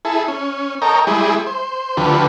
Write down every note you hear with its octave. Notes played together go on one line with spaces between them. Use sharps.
E4 G#4 A4
C#4
A4 A#4 C#5 D#5 G5 A#5
G3 G#3 E4 G#4
C5
D2 D3 F3 G4 B4